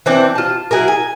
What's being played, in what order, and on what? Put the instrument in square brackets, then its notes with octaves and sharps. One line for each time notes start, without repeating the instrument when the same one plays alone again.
[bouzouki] E3 C4 D4
F4 A5
F#3 E4 G#4 A#4
G#5